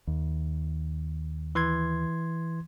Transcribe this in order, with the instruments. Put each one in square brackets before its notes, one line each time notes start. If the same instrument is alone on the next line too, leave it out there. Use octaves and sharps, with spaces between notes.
[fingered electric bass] D#2
[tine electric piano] E3 C6 G#6